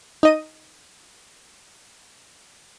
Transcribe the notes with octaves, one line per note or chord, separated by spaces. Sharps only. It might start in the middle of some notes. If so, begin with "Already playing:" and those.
D#4 D#5 D#7